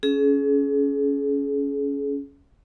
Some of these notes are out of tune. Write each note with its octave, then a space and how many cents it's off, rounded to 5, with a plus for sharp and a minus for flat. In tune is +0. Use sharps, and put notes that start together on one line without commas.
C#4 +15 G#4 +35